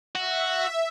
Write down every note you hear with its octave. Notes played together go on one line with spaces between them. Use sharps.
F#4 E5